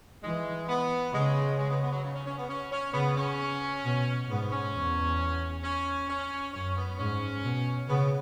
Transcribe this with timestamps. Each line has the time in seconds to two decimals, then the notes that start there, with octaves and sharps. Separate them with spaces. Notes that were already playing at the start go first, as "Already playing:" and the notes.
0.24 E3 G#3
0.69 B3
1.14 C#3 G#3
1.59 G#3
1.70 B3
1.82 B3
1.92 F#3
2.04 C#3
2.15 C#4
2.27 C#4
2.38 B3
2.50 C#4
2.72 C#4
2.93 C#3 B3
3.17 C#4
3.85 B2
4.29 G#2 B3
4.52 C#4
4.74 E2
5.64 C#4
6.09 C#4
6.53 F#2 C#4
6.77 B3
6.99 G#2 C#4
7.44 B2
7.89 C#3 B3